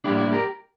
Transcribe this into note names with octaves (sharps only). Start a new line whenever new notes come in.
A2 G3 A#3 D4 E4 G4
E4
G4 A#4